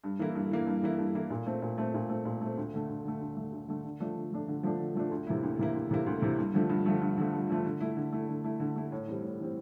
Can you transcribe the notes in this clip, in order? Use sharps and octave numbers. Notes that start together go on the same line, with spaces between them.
G2
E3 A#3 E4
G2
E3 A#3 E4
G2
E3 A#3 E4
G2
E3 A#3 E4
A#2
A3 C4
A#2
A3 C4
A#2
A3 C4
A#2
A3 C4
D2
D3 A3
D2
D3 A3
D2
D3 A3
D2
D3 A3
D3
F3 A3 D4
D3
F3 A3 D4
D3
F3 A3 D4
D3
F3 A3 D4
D2
C3 E3 A#3 E4
D2
C3 E3 A#3 E4
D2
C3 E3 A#3 E4
D2
C3 E3 A#3 E4
G2
D3 F3 A3
G2
D3 F3 A3
G2
D3 F3 A3
G2
D3 F3 A3
D3
A3 E4
D3
A3 E4
D3
A3 E4
D3
A3 E4
A2
E3 G3 C4
A2
E3 G3 C4